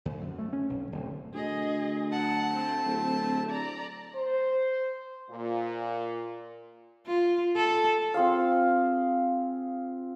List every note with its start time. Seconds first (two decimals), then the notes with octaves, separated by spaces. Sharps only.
0.05 D2
0.21 F#2
0.38 A3
0.53 C#4
0.70 B1
0.92 D1
1.34 D2 G#4 D#5
2.12 F#3 F#5 A5
2.53 A3 C4
2.86 D1
3.50 D5 A#5
4.15 C5
5.31 A#2
7.06 F4
7.56 A4
8.14 C4 F4 G#4 F5